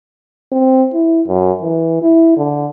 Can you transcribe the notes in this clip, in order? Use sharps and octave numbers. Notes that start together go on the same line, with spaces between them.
C4
E4
F#2
E3
E4
D3